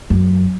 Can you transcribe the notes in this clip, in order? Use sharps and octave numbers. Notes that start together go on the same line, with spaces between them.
F#2